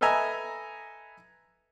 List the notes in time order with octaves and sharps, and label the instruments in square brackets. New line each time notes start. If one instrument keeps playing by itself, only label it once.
[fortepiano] A4 B4 D#5 E5 G#5 A#5